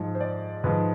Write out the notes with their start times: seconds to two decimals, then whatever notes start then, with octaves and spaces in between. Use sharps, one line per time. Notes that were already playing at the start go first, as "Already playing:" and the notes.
Already playing: G#2 F3
0.15 C5
0.21 D5
0.64 G#2 F3 B4